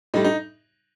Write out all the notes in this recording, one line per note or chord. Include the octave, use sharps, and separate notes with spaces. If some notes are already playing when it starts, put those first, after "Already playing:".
A2 G3 D#4
D#4